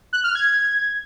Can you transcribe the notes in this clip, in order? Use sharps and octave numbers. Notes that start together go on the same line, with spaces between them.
F#6
F6
G#6